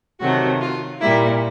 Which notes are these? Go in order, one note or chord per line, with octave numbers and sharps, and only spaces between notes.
C3 D#3 F#3 A3 F#4
F4
A#2 G3 A#3 E4